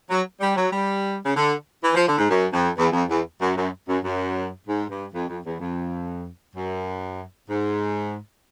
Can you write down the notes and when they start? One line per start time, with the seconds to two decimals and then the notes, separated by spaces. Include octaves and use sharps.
0.10 F#3
0.41 G3
0.56 F#3
0.72 G3
1.26 C#3
1.36 D3
1.82 E3
1.95 F3
2.07 D3
2.18 G#2
2.29 F#2
2.53 F2
2.77 E2
2.92 F2
3.09 E2
3.41 F#2
3.56 F#2
3.87 F#2
4.03 F#2
4.66 G#2
4.89 G2
5.13 F2
5.28 F2
5.45 E2
5.60 F2
6.55 F#2
7.49 G#2